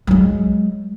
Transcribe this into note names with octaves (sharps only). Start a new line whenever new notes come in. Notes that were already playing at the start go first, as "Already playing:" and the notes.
F#3 G#3